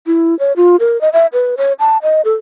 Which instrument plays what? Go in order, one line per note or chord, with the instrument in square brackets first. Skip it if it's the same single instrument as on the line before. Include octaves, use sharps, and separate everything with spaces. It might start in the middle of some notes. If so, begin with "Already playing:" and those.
[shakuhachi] E4
C#5
F4
A#4
D#5
E5
B4
C#5
A5
D#5
A4